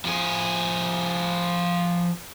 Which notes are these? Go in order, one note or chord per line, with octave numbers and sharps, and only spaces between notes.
F3 G#4